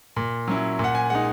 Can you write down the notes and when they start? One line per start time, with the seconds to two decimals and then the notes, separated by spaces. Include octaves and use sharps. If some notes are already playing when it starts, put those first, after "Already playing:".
0.16 A#2
0.48 F#3 C#4 E4
0.79 A#2
0.84 F#5
0.95 G#5
1.10 G#3 D#4 F#5